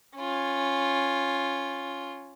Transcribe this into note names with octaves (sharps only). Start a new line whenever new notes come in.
C#4 F4